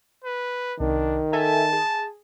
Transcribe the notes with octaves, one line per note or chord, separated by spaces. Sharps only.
B4
C2 D#3 D4
A4 E5 G#5 A5
G#4